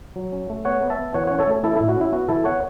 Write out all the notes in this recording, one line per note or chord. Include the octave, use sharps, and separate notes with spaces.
F#3
C#4
A3
B3 C#5 F#5
B3
E5 A5
B3
E3 C#5 F#5
C#4 C#5 F#5
A4 C#5
A3
E3 E4 A4
A2 E4
F#4
C#4 E4
B3 F#4
E3 E4 A4
B3 C#5 F#5